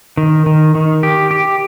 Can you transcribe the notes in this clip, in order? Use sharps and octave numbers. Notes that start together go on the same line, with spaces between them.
D#3
D#3
D#3
G4
G4